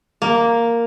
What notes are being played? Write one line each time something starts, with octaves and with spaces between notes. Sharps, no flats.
A#3